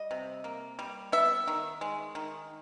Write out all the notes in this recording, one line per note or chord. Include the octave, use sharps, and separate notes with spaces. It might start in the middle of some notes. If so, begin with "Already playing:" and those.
Already playing: G3 D#5
C3
A#3
G3
B3 E5
D#3
G#3
D#3